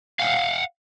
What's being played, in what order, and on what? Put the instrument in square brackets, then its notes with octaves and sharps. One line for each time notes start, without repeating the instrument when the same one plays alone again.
[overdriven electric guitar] F5 F#5